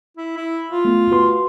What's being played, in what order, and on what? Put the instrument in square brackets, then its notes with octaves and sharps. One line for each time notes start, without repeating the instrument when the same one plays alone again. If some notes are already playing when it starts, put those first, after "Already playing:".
[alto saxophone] E4
E4
F4
[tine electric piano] A3 B3
F#4 B4 C6